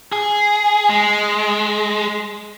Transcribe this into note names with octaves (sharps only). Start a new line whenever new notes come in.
G#4
G#3